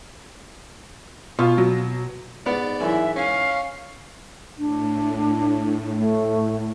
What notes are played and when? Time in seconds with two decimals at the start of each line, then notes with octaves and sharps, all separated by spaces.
1.39 B2 F4
1.58 F#3
2.46 G#2 B3 D5
2.80 F#2 E3 E5
3.16 C#4 F5
4.58 A2 D4
5.96 A3